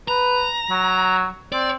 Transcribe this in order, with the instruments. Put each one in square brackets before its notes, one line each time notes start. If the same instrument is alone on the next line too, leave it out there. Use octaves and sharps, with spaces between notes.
[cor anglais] B4 [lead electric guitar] A#5
[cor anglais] F#3
[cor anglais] C4 [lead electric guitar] D5